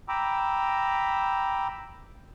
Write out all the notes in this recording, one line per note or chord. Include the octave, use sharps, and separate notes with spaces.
G5 A#5 B5 D6 E6